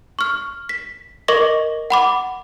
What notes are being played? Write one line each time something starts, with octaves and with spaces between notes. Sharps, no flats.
C#6 F6
B6
A#4 D#5 C#6 D6 A#6
F#5 B5 D6